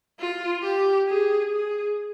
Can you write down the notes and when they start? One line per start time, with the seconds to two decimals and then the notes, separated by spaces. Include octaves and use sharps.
0.19 F4
0.63 G4
1.08 G#4
1.51 G#4